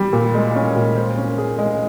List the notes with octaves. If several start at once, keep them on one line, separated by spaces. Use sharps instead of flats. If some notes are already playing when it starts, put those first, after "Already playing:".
Already playing: G3
A#2
G#3
C#4
A#2
C5
C#4
G#4
G#3